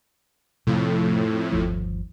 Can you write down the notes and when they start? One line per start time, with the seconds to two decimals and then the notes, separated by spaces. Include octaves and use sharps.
0.67 F2 A2 C3 F3
1.52 G1 D#2 F3